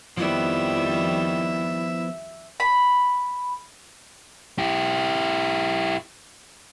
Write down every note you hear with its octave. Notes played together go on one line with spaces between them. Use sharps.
F2 D#3 F3 G3 B3 E4 E5
B5
E4 G4